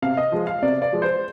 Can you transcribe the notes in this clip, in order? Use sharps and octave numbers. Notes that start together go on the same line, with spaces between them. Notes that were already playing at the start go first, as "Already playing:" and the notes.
C3 F5
D#5
F3 G#3
F5
C3 D5
D5
F3 G#3
C5